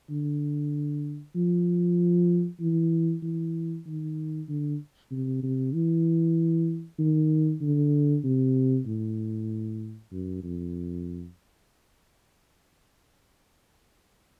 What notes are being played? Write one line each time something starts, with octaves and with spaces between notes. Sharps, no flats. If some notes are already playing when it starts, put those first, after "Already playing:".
D3
F3
E3
E3
D#3
D3
C3
C3
E3
D#3
D3
C3
A2
F#2
F2